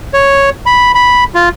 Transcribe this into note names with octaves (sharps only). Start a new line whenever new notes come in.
C#5
B5
B5
F4